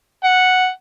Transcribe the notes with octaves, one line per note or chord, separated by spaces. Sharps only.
F#5